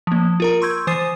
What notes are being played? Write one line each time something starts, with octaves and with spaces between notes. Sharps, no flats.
F3 A#3
F4 A#4 A#5
C6 C#6 E6 G6 G#6
E3 C5 D#6 A6 C7 D#7